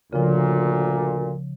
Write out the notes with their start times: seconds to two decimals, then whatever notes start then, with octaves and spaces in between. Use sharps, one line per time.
0.13 D2 A#2 C#3 F3